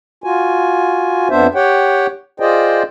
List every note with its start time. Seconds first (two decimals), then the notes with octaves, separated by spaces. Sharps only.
0.24 F4 F#4 G#5
1.30 F2 B3 D4 C5 E5
1.55 G4 C#5 F#5 G5
2.40 F4 G#4 C5 D5 D#5 G5